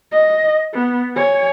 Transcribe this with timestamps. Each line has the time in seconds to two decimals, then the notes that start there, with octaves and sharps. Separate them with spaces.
0.12 D#5
0.73 B3
1.16 C#5 G#5